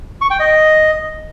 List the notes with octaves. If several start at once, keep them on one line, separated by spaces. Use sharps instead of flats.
C#6
G5
D#5